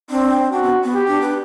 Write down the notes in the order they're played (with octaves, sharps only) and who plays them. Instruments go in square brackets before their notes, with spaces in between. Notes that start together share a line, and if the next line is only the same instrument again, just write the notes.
[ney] C4 [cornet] D4
[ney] D4 [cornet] F#4
[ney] B3
B3
[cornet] G4
[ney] D4
B4